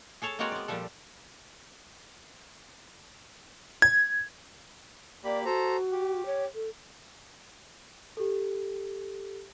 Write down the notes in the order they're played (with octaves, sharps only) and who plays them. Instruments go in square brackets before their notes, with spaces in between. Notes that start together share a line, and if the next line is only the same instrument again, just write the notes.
[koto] G#4 A4 C#5 A5
G#3 A#3 C4 F#4 C#5 D5
B3 D5
A#2 F3 G3 A4
[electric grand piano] G#6
[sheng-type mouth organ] A#3 G4 B5 [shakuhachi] D5
[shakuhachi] F#4 [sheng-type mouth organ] A4 C5 A#5
[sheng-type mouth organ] G4
[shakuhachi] C#5
A4
[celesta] G4 A4